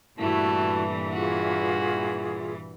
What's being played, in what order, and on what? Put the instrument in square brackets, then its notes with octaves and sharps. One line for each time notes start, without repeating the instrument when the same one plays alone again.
[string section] G2 A#2 E3 [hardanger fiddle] A3 [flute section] E4 F#4
[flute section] F4 G#4 [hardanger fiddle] F#4